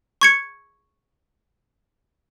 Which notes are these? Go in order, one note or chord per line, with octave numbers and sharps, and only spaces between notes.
C#6 G#6 C#7